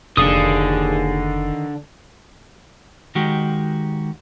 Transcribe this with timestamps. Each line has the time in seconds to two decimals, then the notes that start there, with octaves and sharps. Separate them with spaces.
0.17 F1 A#1 D#2 D3 D#3 G#4 F5 D#6
3.15 D#3 G#3 F#4 G4